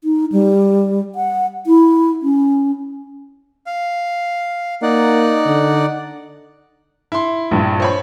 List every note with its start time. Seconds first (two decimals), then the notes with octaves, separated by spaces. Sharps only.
0.04 D#4
0.32 G3
1.15 F#5
1.67 E4
2.22 C#4
3.67 F5
4.82 A#3 D#4 D5 F#5
5.46 D3
7.12 E4 C6
7.51 A#1 G2
7.80 C5 C#5 B5